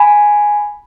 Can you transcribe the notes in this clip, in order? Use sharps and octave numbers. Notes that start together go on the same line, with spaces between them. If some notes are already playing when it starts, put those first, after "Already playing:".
Already playing: G#5 B5